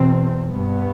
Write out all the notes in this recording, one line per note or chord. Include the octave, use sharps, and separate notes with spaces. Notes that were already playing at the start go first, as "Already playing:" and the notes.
Already playing: E2 B2 C4
G2 B3